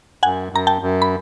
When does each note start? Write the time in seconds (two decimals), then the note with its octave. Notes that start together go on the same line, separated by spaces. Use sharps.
0.23 F#2 F#5 G#5
0.52 F#2 A#5
0.67 G5 A5
0.82 F#2
1.02 B5